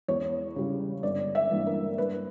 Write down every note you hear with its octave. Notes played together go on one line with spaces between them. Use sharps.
E2 C#5
C#3 G3
G1 D5
E5
G2 E3 A#3
A#4
G2 B4